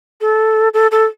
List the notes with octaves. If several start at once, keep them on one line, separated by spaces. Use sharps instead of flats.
A4
A4
A4